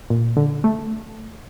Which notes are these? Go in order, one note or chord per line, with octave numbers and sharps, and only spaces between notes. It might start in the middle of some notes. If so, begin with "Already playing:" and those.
A#2
D3
A3